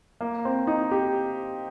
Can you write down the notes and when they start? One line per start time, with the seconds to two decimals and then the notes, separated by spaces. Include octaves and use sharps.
0.21 A#3
0.45 C4
0.67 D#4
0.91 G4